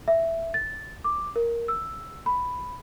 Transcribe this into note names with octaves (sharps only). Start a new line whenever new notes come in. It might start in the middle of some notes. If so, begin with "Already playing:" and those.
E5
A6
D6
A#4
E6
B5